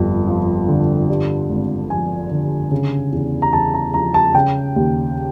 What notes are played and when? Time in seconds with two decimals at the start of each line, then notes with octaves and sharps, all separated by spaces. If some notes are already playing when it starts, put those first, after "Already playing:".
Already playing: G1 F2
0.27 F3
0.68 D3
1.09 G2
1.49 G#1
1.90 F3 G#5
2.31 D3
2.71 C#3
3.12 E2
3.42 A#5
3.53 E2 A5
3.74 A#5
3.94 F3 A#5
4.14 A5
4.34 C#3 G5
4.76 D#2